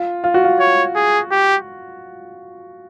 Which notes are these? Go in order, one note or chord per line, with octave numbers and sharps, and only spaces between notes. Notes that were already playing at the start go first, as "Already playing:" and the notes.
Already playing: F4
F4
F#4
F4
C#5
G#4
G4